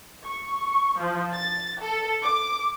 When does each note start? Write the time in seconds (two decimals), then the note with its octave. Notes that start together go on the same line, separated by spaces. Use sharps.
0.24 C#6
0.99 F3
1.33 A6
1.80 A4
2.23 D6